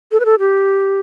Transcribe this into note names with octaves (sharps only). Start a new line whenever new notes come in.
A4
B4
A4
G4